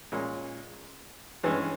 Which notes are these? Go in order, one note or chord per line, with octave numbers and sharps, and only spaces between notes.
A#2 G#3 C#4
G2 E3 G#3 C#4